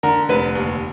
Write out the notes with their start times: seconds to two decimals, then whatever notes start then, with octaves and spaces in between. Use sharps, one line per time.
0.03 D3 A#4
0.29 F1 B4
0.55 D#2